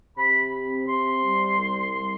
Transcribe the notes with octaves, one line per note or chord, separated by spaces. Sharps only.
C3 B5
C4
C3 C6
G3
C2
G3